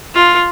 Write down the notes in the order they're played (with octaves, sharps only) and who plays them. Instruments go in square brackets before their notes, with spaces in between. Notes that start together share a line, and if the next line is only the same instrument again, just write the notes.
[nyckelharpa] F4